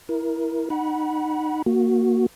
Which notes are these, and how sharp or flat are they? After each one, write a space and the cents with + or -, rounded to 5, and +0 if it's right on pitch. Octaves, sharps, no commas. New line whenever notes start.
E4 +0 A#4 +20
D#4 -20 F#5 +10 B5 -30
A#3 +0 F#4 -5